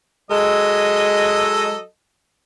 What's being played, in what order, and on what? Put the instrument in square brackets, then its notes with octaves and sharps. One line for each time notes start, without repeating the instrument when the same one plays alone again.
[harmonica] F#3 A4 D#5 [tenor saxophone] G#3